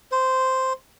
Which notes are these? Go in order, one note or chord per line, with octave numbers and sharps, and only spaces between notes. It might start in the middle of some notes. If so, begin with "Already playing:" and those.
C5